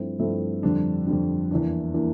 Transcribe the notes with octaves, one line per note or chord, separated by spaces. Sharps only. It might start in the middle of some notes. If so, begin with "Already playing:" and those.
Already playing: G2 F3 A3 C4 E4
G2 F3 A3 C4 E4
F2 D3 G3 D4
F2 D3 G3 D4
E2 E3 A#3 D4
E3 A#3 D4